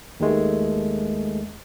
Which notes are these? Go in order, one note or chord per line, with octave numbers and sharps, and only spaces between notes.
D#2 D#3 G#3 A3